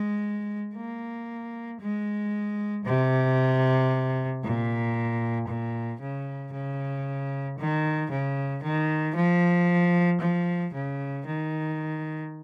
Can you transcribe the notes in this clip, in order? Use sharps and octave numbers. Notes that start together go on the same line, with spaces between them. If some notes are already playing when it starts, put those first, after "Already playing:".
Already playing: G#3
A#3
G#3
C3
A#2
A#2
C#3
C#3
D#3
C#3
D#3
F3
F3
C#3
D#3